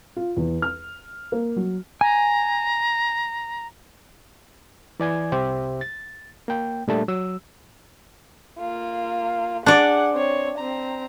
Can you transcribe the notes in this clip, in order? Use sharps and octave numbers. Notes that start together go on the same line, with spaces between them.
F4
E2
F6
A#3
F#3
G#5 A#5
E3 D5 G#5 G#6
C2 C3 G4 C5 E5
A6
A#3 G5
A#2 G3 A3 D4 A5
F#3 E6
A#3 F4
D4 G#4 D5 F#5
C4 C#5
C4 A#5